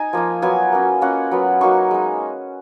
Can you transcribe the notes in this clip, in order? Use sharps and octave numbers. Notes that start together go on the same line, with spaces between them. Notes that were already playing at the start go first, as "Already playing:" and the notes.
Already playing: D#4 G#5
F3 A#3 F4
F#3 B3 F4 G#5
A#3 C#4 F4
A#3 C#4 F4 F#5
F#3 B3 F4
F#3 A#3 D#4 C#6
G#3 D#4